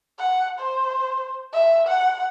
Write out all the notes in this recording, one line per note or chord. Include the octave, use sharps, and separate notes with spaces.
F#5
C5
E5
F#5